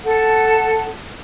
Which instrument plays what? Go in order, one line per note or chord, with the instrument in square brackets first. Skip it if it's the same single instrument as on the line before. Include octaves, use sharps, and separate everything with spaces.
[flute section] A4 F#5 A5